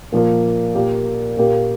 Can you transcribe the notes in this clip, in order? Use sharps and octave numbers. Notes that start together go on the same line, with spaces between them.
A#2 F3 A#3
A#2 A#3 G4
A#2 A#3 G4